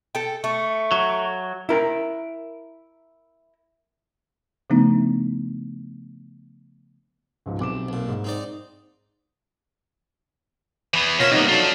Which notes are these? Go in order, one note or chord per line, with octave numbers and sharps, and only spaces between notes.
A4 G5
A3 C#6
F#3
E4 A#4
C#3 F3 A3 B3 D4 D#4
C#2 G#2 F3
B1 C3 D6 E7
B1 A#2
G#2
C4 D#4 D5
E3 B3
B2 F4 A#4 C#5 E5
C3 G3 A#3 B3 D#4
D3 F#3 F4 A4